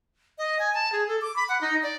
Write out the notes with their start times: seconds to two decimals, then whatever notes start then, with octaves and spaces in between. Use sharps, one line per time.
0.38 D#5
0.59 G#5
0.74 A5
0.92 G#4
1.08 A4
1.22 D6
1.36 B5
1.49 F#5
1.61 D#4
1.83 D5